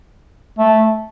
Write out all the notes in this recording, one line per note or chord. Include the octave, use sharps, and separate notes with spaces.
A3